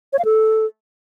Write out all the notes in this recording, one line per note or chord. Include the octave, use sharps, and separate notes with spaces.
C#5
F5
A4